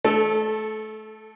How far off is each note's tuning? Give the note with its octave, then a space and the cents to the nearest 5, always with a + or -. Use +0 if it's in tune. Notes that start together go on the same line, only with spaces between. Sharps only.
A3 -25 A4 +0